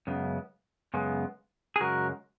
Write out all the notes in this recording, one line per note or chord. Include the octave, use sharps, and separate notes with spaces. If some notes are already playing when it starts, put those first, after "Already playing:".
F#2 C#3 G#3 B3
F#2 C#3 G#3 B3
G#4
F#2 C#3 G#3 F#4 A#4